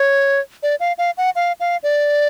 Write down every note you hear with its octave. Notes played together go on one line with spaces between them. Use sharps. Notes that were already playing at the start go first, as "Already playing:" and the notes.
Already playing: C#5
D5
F5
F5
F#5
F5
F5
D5